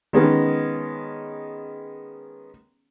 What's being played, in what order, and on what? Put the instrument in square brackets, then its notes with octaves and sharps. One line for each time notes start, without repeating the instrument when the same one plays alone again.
[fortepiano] D#3 G#3 B3 C#4